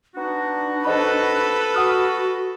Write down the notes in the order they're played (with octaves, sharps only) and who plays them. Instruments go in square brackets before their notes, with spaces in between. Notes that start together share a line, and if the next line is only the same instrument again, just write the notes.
[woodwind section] B3 D#4 F#4 [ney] D4
[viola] A4 B4 [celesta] C5 D#5 B5
[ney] F#4 [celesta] F#5 D#6 F6